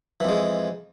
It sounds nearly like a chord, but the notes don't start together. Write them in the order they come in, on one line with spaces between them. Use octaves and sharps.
E3 F2 G#3